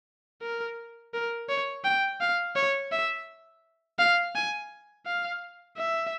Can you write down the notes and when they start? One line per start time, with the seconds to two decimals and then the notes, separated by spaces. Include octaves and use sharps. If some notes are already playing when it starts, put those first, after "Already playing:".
0.42 A#4
1.14 A#4
1.49 C#5
1.84 G5
2.21 F5
2.55 C#5
2.92 E5
3.99 F5
4.35 G#5
5.06 F5
5.77 E5